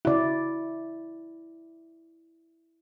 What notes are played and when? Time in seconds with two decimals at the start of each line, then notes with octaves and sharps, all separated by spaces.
0.05 C#3 E4 F#4 D5